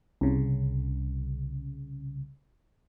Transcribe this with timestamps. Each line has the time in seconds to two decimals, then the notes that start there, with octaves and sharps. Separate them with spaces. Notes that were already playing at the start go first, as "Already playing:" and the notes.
0.21 C2 C#3